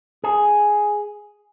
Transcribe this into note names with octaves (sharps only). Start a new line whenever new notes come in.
G#4